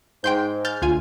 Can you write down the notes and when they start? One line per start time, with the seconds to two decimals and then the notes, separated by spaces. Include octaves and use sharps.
0.24 G#2 G5 C6 G6
0.65 F6 G6 A6
0.82 D2 F4 G#5